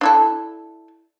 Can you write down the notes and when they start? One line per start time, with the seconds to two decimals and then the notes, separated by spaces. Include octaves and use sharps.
0.01 D4 E4 A4